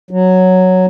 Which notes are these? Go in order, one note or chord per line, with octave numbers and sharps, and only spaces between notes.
F#3